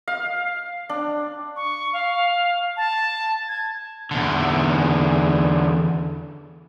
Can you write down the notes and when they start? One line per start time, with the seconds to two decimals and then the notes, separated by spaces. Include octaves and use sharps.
0.08 F5
0.89 D4
1.56 C#6
1.93 F5
2.77 A5
3.48 G#6
4.11 E2 D3